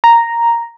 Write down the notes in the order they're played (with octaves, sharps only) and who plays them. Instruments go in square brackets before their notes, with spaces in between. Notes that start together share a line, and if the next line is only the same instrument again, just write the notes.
[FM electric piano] A#5